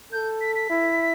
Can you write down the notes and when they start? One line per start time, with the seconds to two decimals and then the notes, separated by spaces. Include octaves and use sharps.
0.13 A4 G6
0.41 B6
0.56 B6
0.70 E4